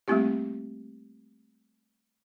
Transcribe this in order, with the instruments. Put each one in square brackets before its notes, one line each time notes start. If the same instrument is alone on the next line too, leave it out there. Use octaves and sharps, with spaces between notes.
[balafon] G3 A3 A#3 C4 E4 G4